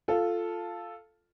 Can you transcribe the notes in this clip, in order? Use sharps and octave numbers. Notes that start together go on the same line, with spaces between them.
F4 A4